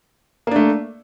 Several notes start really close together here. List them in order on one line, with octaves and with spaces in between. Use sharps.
A#3 D4 A3